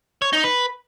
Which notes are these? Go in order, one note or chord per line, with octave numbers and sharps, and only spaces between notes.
C#5
D#4
B4